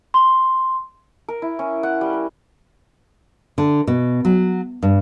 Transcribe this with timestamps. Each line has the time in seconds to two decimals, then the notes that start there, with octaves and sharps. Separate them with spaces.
0.14 C6
1.28 A#4
1.42 E4
1.59 C#4
1.83 F#5
2.01 G3
2.13 A#4
3.58 D3
3.87 B2
4.25 F#3
4.83 G2